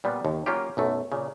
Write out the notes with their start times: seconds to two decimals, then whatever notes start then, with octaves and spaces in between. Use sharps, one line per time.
0.04 A#2 G3 B3 F4
0.25 D#2
0.46 F#3 A#3 C#4 F4 G4
0.77 B1 F#2 A3
1.12 A#2 C#3